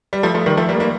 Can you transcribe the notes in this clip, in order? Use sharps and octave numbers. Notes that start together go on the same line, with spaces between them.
G3
F3 A3
F3 A3
D#3 G3
F3 A3
G3 A#3
G3 A#3